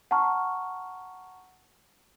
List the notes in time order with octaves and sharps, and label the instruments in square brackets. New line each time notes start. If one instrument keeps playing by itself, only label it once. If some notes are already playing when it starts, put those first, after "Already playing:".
[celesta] F#5 A5 A#5 C#6 F6